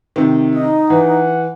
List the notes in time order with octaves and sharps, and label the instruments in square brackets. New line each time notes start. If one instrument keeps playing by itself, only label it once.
[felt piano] C3 D#3
[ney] D#4 [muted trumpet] D#5
[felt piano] E3 [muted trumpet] F#5